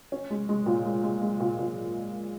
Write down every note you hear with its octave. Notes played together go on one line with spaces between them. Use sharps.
C#4
G#3
G#3
A#2
G#3
G#3
G#3
A#2
A#2